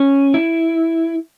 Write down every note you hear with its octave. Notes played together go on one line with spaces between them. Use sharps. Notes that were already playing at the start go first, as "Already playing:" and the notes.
Already playing: C#4
E4